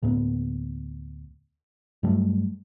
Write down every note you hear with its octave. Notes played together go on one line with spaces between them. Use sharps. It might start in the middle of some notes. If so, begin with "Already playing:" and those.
D2 A2 A#3 B3
G2 F#3 G3 A3